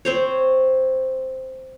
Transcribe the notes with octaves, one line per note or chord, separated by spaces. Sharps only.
C4 C5 C#5